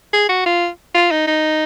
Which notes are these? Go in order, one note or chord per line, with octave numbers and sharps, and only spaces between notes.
G#4
F#4
F4
F4
D#4
D#4